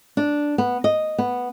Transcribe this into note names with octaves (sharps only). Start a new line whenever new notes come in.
D4
B3
D#5
B3